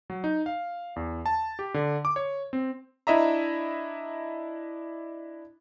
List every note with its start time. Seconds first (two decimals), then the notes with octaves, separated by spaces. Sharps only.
0.10 F#3
0.24 D#4
0.46 F5
0.96 E2
1.26 A5
1.59 G4
1.74 D3
2.05 D6
2.16 C#5
2.53 C4
3.07 D4 E4 D#5 E5 A#5